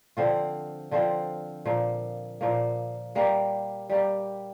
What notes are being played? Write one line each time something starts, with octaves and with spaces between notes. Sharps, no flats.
D3 F3 C4 F4
D3 F3 C4 F4
A#2 F3 A#3
A#2 F3 A#3
G3 A#3 G4
G3 A#3 G4